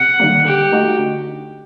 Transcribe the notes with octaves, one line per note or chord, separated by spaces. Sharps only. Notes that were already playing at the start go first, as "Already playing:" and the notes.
Already playing: C3 F#5
D#3 G3 A#3
D3 G4
A3 D#4 F#4
D3